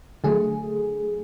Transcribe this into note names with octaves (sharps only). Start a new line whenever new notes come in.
D3 F#3 A3 G#4